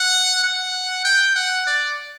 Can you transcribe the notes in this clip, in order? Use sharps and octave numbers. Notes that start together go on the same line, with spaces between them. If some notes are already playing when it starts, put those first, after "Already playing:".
Already playing: F#5
F#5
G5
F#5
D5